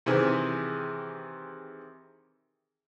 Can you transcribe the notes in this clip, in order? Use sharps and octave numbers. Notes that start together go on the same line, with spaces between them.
C3 D#3 E3 C4 G#4